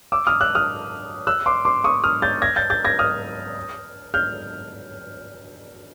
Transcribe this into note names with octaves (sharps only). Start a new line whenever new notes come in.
D6 E6
D#6 F6
E6 F#6
D#6 F6
E6 F#6
C6 D6
C6 D6
C#6 D#6
D#6 F6
G6 A6
G#6 A#6
G6 A6
G6 A6
G#6 A#6
D#6 F6
F6 G6